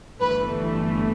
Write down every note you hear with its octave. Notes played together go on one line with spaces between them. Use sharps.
G1 G2 E3 A3 B4